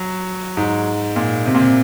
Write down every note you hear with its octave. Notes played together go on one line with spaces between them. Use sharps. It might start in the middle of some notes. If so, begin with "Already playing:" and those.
Already playing: F#3
G#2
A#2
C3
A#2
C3